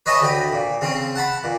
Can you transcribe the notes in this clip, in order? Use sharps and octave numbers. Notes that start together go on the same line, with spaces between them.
B4 C#5 D#5 E5 G#5 A5
D2 G4 B5
A#2
C#3 C4 C#4
F#5 A5 B5
A#2